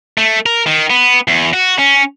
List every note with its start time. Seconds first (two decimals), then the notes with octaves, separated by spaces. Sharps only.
0.18 A3
0.46 A#4
0.67 D#3
0.90 B3
1.28 E2
1.53 F#4
1.79 C#4